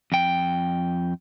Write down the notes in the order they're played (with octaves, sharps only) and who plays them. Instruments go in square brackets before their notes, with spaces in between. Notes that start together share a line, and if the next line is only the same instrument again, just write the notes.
[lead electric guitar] F2 G5